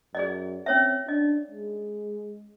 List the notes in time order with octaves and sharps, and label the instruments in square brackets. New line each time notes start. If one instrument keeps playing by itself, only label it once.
[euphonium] F#2 [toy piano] G#4 D5 D#5
[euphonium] C4 [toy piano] C#4 C#5 E5
[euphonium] D4 [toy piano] D#5
[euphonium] G#3